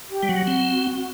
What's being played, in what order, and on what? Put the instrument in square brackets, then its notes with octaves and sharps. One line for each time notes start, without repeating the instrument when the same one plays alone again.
[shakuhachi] G4
[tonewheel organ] G3
[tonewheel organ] F#3 [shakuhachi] F#4
[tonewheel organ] C4